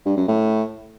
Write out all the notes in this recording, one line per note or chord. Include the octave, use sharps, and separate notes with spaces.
G2
F#2
A2